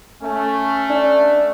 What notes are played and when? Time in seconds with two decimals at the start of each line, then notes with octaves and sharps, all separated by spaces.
0.23 A3 C#4
0.90 D4